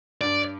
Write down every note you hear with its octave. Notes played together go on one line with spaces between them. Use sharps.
G2 D5